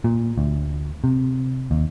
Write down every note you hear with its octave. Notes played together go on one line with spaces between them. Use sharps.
A#2
D2
C3
D#2